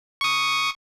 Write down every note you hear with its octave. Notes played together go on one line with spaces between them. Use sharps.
C#6 D#6